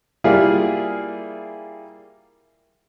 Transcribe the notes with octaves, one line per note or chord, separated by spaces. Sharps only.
G3 A#3 E4 F4 G#4 D5